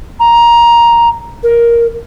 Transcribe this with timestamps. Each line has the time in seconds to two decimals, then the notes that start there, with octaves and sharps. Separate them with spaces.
0.19 A#5
1.43 A#4